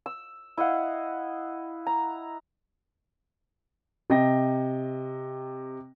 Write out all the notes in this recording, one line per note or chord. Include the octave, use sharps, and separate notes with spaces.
E6
E4 D#5 F5 F#5
A#5
C3 D#5 G5 A#6